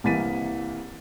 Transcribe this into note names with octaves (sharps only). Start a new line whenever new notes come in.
C2 E3 A#3 A6 B6 D#7